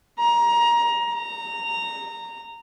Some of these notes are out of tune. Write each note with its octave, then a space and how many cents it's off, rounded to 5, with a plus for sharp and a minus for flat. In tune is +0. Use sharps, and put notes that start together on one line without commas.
A#5 +20
A#5 -15